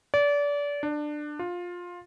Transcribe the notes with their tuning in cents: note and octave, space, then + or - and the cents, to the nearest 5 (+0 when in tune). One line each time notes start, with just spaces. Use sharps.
D5 -30
D4 +20
F4 +15